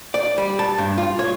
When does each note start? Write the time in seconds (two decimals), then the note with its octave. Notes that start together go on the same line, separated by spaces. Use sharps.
0.14 D5
0.38 G3
0.59 A5
0.78 G2
0.98 F4
1.19 C#5